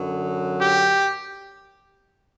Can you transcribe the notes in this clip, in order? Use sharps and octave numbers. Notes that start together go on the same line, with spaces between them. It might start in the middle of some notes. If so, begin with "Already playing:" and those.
Already playing: F#2 D3 F#3
G4